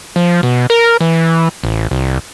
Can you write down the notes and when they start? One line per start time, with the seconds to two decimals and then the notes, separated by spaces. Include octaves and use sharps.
0.16 F3
0.43 B2
0.70 A#4
1.01 E3
1.64 A1
1.91 C2